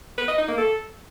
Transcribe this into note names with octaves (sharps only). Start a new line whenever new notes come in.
B4
D#5
D#4
A#3
A4